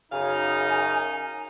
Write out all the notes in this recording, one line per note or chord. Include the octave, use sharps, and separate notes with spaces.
F#2 C#3 D#4 F5 G#5